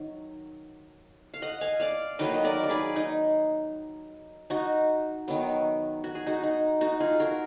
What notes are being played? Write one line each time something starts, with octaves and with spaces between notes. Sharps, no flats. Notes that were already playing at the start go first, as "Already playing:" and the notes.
Already playing: D#3 F#3
F5
D#5 F#5
F5 G#5
D5 F5
D#3 F#3 A#3 B4 D#5
D#5
A#4 D5
D5
G#4 B4
D#4
D#4 F#4
D#3 F#3 B3
F#4
G#4
D#4 F#4
D#4
D#4 F#4
F4 G#4
F#4 A#4